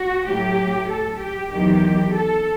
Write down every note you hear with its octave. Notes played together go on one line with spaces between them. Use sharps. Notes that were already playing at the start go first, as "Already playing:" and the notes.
Already playing: F#4
A2 F#3 G4
A4
G4
E2 D#3 F#3 G4
A4